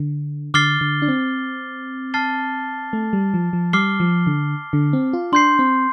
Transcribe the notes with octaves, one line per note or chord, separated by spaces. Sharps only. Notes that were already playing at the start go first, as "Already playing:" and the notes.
Already playing: D3
D3 D6 F6 A6 C7 G7
D3
D4
C4
A5 F6 A6 C7 G7
A3
G3
F3
F3
G3 D6 F6 C7 G7
F3
D3
D3
C4
F4
D4 C6 G6 C7
C4